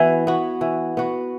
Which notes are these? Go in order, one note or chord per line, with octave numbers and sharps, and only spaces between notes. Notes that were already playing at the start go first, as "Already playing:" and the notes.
Already playing: E3 B3 F#4
B3 F#4
E3
B3 F#4